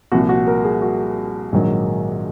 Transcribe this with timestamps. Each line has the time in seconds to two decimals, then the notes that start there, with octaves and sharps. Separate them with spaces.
0.12 C2 A#2 F3 F#4
0.29 F#4
0.47 A#4
0.64 G#4
0.82 F#4
1.52 A#1 G#2 D#3 F#3